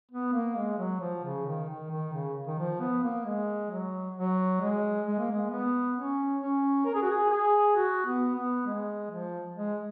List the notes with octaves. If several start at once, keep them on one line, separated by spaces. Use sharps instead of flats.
B3
A#3
G#3
F#3
F3
C#3
D#3
D#3
D#3
C#3
D#3
F3
B3
A#3
G#3
F#3
F#3
G#3
G#3
A#3
G#3
B3
C#4
C#4
A#4
G#4
F#4
G#4
G#4
F#4
B3
B3
G#3
F3
G#3